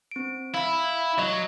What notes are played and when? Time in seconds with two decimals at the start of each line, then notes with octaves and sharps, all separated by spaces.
0.11 C4 D7
0.54 E4 F5 B5
1.18 F#3 D#5